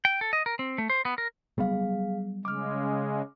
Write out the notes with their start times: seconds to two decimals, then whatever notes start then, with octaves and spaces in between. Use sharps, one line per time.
0.05 G5
0.21 A4
0.33 D#5
0.46 A#4
0.59 C4
0.78 A3
0.90 C5
1.05 B3
1.18 A#4
1.58 F#3 G3 B3 G#4 F5
2.45 C#3 G#3 D6 F6